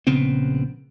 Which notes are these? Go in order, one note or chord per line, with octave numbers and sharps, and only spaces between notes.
A#1 C#3 B3 C4